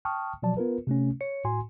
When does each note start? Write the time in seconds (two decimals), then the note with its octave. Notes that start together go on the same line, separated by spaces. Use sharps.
0.05 G5 A5 C#6 D#6 F6
0.43 B2 F3 F#3 D5 A5
0.57 B3 F4 A#4 B4
0.87 C3 A3 C#4
1.21 C#5 C#7
1.45 A2 F#4 G#5 C6